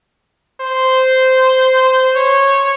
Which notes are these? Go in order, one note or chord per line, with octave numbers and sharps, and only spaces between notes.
C5
C#5